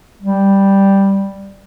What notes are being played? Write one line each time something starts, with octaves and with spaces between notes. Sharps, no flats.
G3